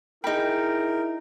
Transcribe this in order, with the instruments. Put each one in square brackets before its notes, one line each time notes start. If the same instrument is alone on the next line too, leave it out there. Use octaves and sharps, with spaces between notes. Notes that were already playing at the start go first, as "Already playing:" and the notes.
[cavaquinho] D#4 B5 [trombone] E4 [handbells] G#4 G5 [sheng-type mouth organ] A#4